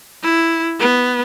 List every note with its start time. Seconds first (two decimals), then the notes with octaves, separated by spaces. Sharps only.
0.23 E4
0.80 B3